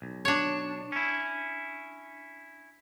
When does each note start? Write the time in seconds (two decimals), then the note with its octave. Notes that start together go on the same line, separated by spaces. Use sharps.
0.02 B1
0.25 D4 C#5
0.92 C#4 E4